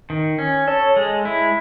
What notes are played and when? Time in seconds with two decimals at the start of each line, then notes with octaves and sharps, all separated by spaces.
0.10 D#3
0.39 C#4
0.67 A4 C#5
0.97 G#3
1.25 E4